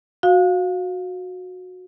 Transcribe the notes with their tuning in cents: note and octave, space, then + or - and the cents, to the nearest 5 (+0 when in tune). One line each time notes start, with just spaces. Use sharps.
F#4 -15 F5 +10